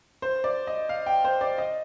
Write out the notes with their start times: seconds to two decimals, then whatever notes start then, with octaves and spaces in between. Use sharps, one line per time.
0.22 C5
0.44 D5
0.67 D#5
0.89 F5
1.06 G5
1.25 C5
1.41 D5
1.58 D#5